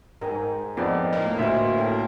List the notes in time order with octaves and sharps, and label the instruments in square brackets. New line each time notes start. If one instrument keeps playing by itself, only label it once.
[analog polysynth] G#2 [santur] A#4 G5 G#5
[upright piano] F2 D5 [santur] B3 D#4 A5
[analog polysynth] A2 A#3
[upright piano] D2 E5 [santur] F4 F#4 C5
[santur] C#4 A4 G5